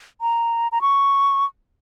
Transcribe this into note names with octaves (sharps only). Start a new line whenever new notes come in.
A#5
A#5
C#6